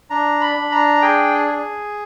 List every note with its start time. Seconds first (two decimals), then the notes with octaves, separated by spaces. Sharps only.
0.10 D4 A#5
0.41 B5
0.55 D4
0.71 A#5
1.02 G#4 G5
1.48 G#4